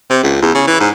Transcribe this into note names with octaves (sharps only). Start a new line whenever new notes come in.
C3
C#2
E2
C#3
E3
G#2